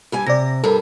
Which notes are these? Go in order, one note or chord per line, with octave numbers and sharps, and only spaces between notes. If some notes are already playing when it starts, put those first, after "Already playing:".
G2 G3 G#5
C3 D5 A#6
G2 G3 A4 A#4